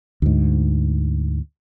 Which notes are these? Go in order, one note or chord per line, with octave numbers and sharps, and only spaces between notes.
D2 G#2